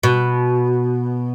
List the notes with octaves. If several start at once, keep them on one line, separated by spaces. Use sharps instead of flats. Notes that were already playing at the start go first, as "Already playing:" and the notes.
B2